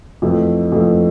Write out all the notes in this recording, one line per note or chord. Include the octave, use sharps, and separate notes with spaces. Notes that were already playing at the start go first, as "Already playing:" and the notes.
F2 E3 A3
F2 E3 A3